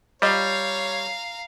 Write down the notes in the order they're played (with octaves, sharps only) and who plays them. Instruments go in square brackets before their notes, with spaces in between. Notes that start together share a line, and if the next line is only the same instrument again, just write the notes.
[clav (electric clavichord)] G3 [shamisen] F4 D#5 [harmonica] C#5 [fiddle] F5 A#5